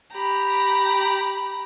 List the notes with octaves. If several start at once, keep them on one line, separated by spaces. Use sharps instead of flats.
G4 A#5 B5